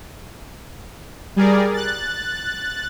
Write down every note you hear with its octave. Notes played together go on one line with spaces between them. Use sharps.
G3 G#4 A#4 D5
F#6 A6